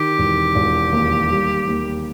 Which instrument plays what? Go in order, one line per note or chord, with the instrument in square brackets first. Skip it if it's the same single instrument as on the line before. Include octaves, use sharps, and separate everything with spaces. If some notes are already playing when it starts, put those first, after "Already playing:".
Already playing: [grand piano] D#3 [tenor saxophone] G4
[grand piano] E1
E1
D#2
G3
D#2